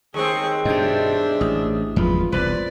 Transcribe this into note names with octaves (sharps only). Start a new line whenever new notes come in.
D#2 G#3 C4 G#4 C#6
G2 B2 D4 D#5 E5 G6
A1 D#6
G1 E2 F3 F#3 G#3 F4 B4
E1 C2 B4 C5 D5